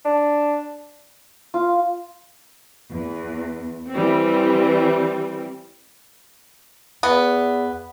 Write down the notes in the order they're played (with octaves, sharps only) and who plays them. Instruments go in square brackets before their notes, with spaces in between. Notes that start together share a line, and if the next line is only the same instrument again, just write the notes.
[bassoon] D4
[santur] F4
[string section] E2
E3 G3 C4
[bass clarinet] E2 [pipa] B3